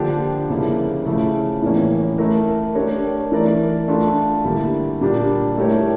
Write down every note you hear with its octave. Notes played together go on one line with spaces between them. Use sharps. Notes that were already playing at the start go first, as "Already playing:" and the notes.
Already playing: D3 F3 A#3 D4 G4
C#3 F3 A#3 E4
C#3 F3 A3 E4
A2 E3 A#3 C#4
A3 E4 A#4
A3 D4 G4 A#4 C#5
E3 A3 E4 A#4 D5
A3 D4 F4 A4
D3 G3 A#3 E4
A#2 G3 A#3 D4 G4
A3 E4 G4 A#4 C#5